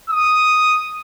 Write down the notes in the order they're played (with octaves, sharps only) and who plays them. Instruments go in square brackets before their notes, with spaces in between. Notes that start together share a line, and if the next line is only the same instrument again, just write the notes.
[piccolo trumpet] D#6